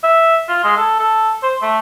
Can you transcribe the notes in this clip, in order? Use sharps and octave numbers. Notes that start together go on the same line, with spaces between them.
E5
F4
G#3
A4
A4
C5
A3